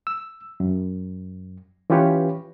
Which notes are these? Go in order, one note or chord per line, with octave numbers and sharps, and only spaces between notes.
E6
F#2
E3 C#4 F4 G4 B4 C#5